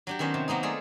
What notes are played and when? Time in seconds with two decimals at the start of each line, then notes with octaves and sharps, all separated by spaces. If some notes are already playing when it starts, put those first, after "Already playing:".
0.07 F#3 D4 G4
0.19 D#3 B3 C#4 C5
0.34 C3
0.48 F#3 A#3 B3 D#4
0.63 A3 F4 G#4 D5